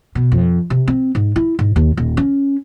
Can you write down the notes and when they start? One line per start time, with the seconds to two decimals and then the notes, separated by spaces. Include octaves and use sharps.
0.15 B2
0.32 F2
0.70 C3
0.88 C4
1.15 G#2
1.36 E4
1.59 G#2
1.76 D#2
1.97 D#1
2.17 C#4